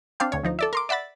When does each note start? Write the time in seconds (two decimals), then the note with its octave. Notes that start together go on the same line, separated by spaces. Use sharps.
0.20 C4 D4 C5 F5 G5
0.32 D2 C#5
0.43 D2 F3 D#4
0.59 A4 D5 E5
0.73 A#4 C6 D6
0.89 D5 E5 F#5 B5 A6